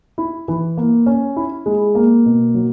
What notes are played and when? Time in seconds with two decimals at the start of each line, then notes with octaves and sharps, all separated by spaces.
0.18 E4
0.48 E3
0.77 A#3
1.06 C#4
1.36 E4
1.66 G#3
1.95 A#3
2.25 B2
2.54 F#3